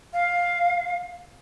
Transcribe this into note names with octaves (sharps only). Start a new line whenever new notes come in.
F5